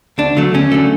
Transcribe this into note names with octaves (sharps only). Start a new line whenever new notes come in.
D2 D4
D3 F#3 A3
D2 C#4
D3 F#3 A3